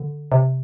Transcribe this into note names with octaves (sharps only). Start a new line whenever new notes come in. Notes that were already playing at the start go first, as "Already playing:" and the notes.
Already playing: D3
C3